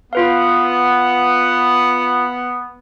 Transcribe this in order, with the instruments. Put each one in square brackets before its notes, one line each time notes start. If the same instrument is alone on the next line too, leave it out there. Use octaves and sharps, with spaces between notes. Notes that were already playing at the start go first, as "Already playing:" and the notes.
[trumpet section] B3 [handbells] F4 B4 F5